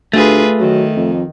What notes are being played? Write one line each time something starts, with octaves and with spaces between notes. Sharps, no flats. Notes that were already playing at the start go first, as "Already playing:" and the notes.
D2 A3 F4 G#4 B4
D#3 F#3
F2